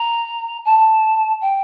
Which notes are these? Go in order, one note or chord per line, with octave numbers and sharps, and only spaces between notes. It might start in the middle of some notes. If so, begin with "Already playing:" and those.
Already playing: A#5
A5
G5